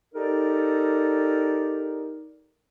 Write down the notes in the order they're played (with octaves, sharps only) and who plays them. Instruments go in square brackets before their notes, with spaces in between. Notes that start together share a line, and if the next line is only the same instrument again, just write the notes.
[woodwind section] D#4 G4 A4 A#4 D5